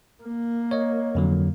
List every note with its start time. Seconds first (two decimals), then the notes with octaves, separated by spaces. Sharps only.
0.23 A#3
0.71 C#5 D#5
1.15 F2 D3 F#3